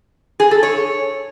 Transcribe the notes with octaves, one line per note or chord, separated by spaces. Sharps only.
G#4
A4
C#5